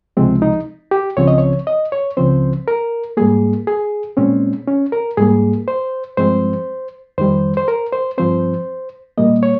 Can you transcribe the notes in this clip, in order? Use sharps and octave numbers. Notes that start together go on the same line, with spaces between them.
C#2 C3 F3 G#3 C4
D#4
G4
C#2 C#3 F3 C4 C#5
D#5
C#5
D#5
C#5
C#2 C#3 F3 C4 C5
A#4
G#2 G3 A#3 G#4
G#4
A#2 G#3 C4 C#4
C#4
A#4
G#2 G3 A#3 G#4
C5
G2 F3 G#3 C4 C5
F2 D#3 G3 C5
C5
A#4
C5
G2 F3 C4 C5
A#2 G3 A#3 D#5
C#5